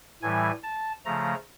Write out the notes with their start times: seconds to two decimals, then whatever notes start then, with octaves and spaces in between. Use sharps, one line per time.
0.22 A2 E3 G3 G#5
0.63 A5
1.05 C#3 F3 A3 A#5